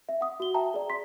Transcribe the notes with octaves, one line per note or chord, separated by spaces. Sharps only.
E5
F#5 D#6
F#4 G7
E5 G5 A5 A#5
G#4 D5
C6 B6